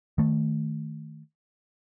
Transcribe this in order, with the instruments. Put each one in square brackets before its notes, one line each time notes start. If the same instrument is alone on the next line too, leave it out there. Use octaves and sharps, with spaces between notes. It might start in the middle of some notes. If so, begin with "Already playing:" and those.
[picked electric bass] D#3 A3